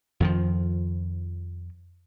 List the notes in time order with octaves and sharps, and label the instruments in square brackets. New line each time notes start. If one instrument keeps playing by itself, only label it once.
[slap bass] F2 D#3 F3